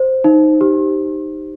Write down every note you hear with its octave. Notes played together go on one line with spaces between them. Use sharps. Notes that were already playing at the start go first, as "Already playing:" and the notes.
Already playing: C5
D#4
G4